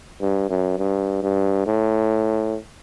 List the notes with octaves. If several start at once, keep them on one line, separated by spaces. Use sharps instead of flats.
G2
F#2
G2
G2
A2